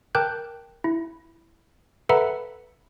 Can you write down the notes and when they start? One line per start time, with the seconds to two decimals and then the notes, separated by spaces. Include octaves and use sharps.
0.15 A#4 G5 A5 D6 F#6 G6
0.84 E4
2.09 A4 B4 E5 F#5 A#5 B5